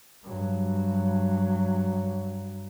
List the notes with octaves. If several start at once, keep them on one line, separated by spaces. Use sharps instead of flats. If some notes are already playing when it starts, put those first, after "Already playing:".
G2 F#3